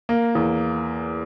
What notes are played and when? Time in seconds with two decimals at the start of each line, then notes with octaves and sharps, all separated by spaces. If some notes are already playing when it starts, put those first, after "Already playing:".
0.09 A#3
0.35 E2